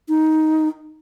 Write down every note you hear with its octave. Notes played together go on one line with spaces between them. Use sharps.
D#4